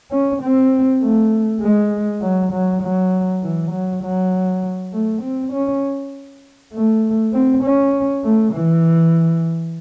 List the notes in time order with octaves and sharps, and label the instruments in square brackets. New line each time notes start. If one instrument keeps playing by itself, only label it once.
[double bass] C#4
C4
A3
G#3
F#3
F#3
F#3
E3
F#3
F#3
A3
C4
C#4
A3
C4
C#4
A3
E3